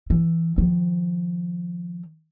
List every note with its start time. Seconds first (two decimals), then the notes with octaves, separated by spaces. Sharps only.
0.10 E3
0.58 D#3 F3